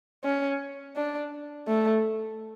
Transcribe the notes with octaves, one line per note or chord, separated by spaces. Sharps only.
C#4
D4
A3